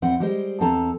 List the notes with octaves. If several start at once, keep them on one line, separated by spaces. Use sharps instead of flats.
E2 C4 F#5
G3 G#3 C5
E2 C4 A4 A5 A#5